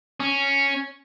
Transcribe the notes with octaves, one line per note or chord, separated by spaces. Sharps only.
C#4